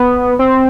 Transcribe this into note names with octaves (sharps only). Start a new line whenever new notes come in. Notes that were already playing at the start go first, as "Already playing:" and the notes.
Already playing: B3
C4